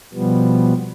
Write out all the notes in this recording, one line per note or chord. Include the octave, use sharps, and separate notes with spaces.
B2 F3 G3 B3